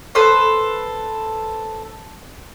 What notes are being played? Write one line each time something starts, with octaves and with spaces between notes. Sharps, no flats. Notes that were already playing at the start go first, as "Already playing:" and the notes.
A4 B4 C5